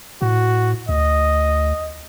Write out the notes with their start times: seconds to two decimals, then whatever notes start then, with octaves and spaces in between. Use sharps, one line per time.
0.22 A2 F#4
0.89 D2 D#5